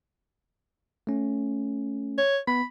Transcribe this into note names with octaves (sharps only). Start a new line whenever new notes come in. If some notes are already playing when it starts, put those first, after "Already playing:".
A3 C#4
C#5
B3 B5